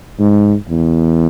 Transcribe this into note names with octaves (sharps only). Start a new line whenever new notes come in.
G#2
E2